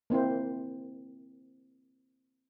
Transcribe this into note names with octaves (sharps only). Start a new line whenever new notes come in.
A#3 C4 E4 C5